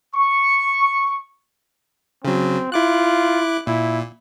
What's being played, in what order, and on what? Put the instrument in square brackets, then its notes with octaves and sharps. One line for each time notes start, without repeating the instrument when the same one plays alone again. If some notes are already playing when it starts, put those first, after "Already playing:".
[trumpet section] C#6
[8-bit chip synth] C#3 F#3 [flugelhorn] C4
[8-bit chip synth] E4 D6 F#6 [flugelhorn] F4
[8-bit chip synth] A#2 [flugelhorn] E4